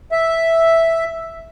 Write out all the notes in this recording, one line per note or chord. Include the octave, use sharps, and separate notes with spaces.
E5